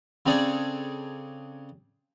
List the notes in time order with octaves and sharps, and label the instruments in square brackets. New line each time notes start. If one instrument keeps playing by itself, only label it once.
[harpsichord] C#3 C4 D4 G#4 A4